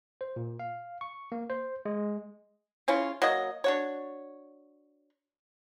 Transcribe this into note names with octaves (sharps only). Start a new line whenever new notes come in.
C5
A#2
F5
C#6
A#3
C5
G#3
C#3 C#4 E4 F4
F#3 A#3 D#5
D4 F#4 C#5